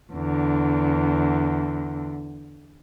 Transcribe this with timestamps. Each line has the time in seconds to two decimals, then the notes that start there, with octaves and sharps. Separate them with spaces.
0.13 E2 D3